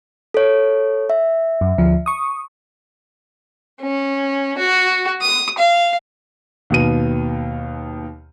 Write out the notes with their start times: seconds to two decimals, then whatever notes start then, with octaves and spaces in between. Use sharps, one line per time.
0.34 A4 C#5
1.10 E5
1.61 F#2
1.78 D2 F3
2.06 C#6 D#6
3.81 C#4
4.58 F#4
5.21 D#6
5.58 F5
6.70 D#2 B2 D#7